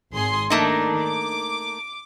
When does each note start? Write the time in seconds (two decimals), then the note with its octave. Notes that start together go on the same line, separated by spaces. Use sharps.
0.13 G#1 G#4 C6
0.50 D#3 A3 A#3 D4 D#4
1.01 D6